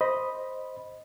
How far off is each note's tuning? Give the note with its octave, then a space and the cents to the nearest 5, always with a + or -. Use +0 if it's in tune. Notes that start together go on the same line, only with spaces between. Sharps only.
C5 +0 D#5 +0 B5 -5